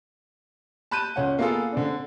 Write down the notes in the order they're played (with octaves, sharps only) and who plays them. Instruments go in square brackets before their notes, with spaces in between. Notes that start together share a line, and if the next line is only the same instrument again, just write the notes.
[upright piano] A5 B5 F#6 G6 D#7
C#2 C#4 F#5
A#3 B3 F4 G#4 A4
D3 C4 D4